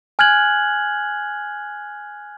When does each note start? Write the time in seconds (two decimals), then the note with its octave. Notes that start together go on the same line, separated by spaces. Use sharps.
0.19 G#5 F6 F#6 G#6 F#7